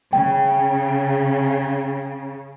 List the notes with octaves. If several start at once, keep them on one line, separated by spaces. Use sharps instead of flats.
C#3 G5